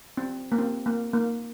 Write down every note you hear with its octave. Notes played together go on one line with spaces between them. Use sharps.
C4
A#3
C4
A#3
A#3